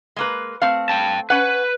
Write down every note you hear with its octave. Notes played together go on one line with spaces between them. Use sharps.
G#3 A#3 B4
A3 C4 F5
G5 A5
C#4 B4 F#5